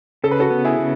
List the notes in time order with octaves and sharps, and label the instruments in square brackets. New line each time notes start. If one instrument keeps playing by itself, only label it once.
[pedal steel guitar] C#3 [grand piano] A4
[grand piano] B4
F#4 A4
[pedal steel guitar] B3
[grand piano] E4 G#4
[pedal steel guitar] C#3